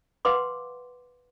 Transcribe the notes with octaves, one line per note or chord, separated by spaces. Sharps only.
B4 F5 F#5 C6 D6